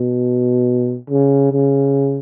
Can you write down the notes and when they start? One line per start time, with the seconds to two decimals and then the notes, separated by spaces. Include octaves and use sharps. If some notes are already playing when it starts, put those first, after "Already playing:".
Already playing: B2
1.10 C#3
1.52 C#3